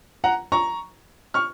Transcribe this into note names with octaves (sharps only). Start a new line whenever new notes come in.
F#5 A#5
A#5 C#6
C#6 F6